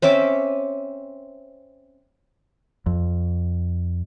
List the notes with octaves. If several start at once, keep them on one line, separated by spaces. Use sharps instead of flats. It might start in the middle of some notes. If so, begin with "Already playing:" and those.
C4 C#4 E5 D6
F2